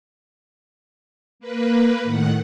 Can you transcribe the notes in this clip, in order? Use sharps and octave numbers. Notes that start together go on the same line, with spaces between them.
A#3 B4
A2 D#3 F#5